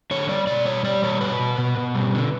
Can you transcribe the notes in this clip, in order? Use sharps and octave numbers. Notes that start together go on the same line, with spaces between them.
D3 C#5
G3 D5
B2 D5
G3 C#5
G3 D5
B2 C#5
B2 B4
B2
B2
B2
G3
D3